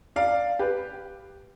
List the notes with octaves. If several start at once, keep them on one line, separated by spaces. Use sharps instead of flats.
D5 F5
G4 B4